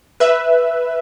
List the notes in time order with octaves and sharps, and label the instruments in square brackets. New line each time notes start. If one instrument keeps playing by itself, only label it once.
[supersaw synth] B4 E5